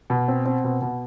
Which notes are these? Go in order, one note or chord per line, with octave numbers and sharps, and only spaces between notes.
B2
C4
C4
B2
B2